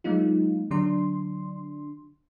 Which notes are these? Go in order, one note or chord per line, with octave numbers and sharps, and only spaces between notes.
F#3 G#3 A#3 D#4 F4
D3 F#3 D4 C6